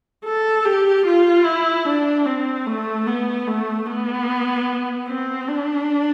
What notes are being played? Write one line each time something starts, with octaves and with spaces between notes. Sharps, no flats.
A4
G4
F4
E4
D4
C4
A3
B3
A3
B3
C4
D4